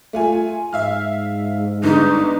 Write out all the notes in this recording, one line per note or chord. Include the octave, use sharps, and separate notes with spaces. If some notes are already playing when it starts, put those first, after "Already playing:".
A3 F4 G#5
G#2 E5 F5 F6
G1 D3 D#4